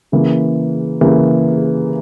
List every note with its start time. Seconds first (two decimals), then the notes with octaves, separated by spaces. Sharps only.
0.12 C#3 E3 A#3
1.01 C#3 E3 A#3